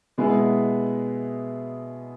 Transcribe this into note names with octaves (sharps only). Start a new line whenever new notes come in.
B2 G#3 B3 E4 G#4